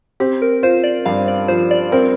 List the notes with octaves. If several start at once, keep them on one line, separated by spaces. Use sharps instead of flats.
C4 G4
A#4
F4 C5
D5
G2 F5
D5
F3 C5
D5
C4 A#4